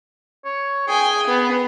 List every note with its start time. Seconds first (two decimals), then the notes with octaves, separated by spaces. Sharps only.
0.45 C#5
0.88 G#4 G5 G#5
1.27 B3